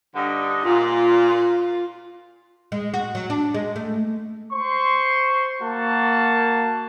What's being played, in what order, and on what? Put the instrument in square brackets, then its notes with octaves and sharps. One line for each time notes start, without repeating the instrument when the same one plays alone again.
[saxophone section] G2 D3 D#4
[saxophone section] A#2 [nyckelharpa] F4
[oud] G#3
F#4
F#3
D4
G#3
A3
[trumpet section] C5 C6 C#6
A#3 F#4 A5